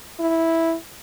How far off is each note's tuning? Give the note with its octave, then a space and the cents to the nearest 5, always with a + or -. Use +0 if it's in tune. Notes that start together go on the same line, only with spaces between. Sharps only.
E4 -5